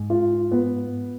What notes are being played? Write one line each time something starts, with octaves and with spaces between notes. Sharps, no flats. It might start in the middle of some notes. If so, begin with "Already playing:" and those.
Already playing: G#2
F4
B3